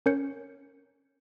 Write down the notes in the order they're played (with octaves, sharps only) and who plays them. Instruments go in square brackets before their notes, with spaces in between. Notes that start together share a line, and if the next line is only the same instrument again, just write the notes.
[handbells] C#4 A#4 C#5 G6 C#7